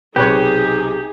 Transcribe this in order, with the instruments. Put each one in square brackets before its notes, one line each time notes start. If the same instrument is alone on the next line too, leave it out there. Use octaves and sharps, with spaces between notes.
[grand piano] B1 C3 [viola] D#4 G#4 [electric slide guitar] G4 [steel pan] B4 C#5